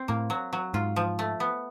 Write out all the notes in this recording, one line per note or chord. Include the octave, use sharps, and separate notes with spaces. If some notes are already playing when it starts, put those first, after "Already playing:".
Already playing: C4
A2 A#3
F#3
F#3
G#2 F4
F3
A3
B3